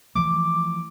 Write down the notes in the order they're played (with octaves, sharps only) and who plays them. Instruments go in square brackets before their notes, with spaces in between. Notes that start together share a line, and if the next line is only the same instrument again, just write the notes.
[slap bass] E3 F3 A3 [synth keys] D6